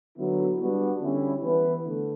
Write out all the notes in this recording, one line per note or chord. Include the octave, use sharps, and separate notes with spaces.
D3 F#3 B3 E4
G3 B3 D4 F#4
D3 G3 C#4 E4
E3 B3 E4 B4
D3 A3